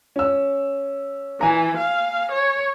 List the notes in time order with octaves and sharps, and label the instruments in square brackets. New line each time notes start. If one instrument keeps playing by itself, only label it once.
[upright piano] C#4 E6
[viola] E3 [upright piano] G#5 A#5
[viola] F5
C#5